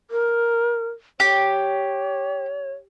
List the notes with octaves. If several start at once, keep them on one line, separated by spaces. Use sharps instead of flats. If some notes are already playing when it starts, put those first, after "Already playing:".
A#4
G4 C#5